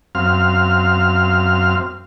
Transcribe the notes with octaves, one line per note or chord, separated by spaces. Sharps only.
F#2 C4 F5 F6